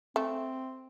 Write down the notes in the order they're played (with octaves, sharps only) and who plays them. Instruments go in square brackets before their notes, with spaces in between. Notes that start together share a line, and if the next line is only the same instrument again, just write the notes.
[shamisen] A3 [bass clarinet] C4